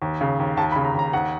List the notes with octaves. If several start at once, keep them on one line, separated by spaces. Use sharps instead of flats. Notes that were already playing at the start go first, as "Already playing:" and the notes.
D#2
C#3
D#2
D#2 A5
B5
C#3
A#5
D#2
A#5
D#2 F#5